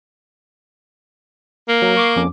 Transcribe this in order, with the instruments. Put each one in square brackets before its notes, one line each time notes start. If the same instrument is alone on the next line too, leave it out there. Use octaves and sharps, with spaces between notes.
[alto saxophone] A#3
[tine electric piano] F#3
C#6 D6 C7
F2 C#4 D6